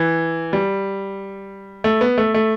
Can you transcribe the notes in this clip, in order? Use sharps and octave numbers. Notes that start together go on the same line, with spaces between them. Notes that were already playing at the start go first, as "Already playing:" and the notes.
Already playing: E3
G3
A3
B3
A3
A3